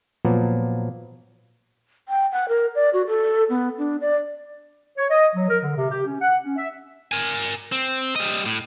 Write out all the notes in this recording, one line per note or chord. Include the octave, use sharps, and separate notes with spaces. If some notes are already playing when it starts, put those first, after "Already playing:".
A#2 F3 F#3 A#3 B3
G5
F#5
A#4
D5
F#4
A4
B3
D4
D5
C#5
D#5
F#3
A#4
D3
C3
G4
C#4
F#5
C#4
E5
A#4 G#5
C4
G3 D#5
A2